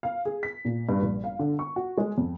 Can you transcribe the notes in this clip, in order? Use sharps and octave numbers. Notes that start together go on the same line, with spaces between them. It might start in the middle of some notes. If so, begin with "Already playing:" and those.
F5
G#4
B6
A#2
G2
A#1
F5
D3
C#6
F#4
G#3
F2